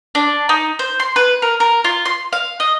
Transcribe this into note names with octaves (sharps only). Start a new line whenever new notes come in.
D4
D#4
C5
C6
B4
A#4
A#4
F4
C6
F5
D#5